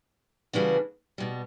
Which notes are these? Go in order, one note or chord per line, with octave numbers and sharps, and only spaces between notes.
C#3 E3 G3 D4 F#4
B2 G3